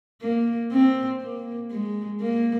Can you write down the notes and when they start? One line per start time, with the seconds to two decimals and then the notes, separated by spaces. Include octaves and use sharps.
0.22 A#3
0.72 C4
1.22 A#3
1.71 G#3
2.21 A#3